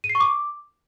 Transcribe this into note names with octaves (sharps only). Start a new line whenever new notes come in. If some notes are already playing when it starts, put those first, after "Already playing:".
D#7
C7
C#6
D6